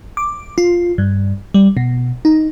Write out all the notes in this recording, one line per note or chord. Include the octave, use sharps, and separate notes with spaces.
D6
F4
G2
G3
B2
D#4